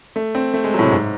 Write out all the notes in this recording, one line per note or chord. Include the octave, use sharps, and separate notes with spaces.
A3
C4
A3
G#3
F#3
A2
C3
G#2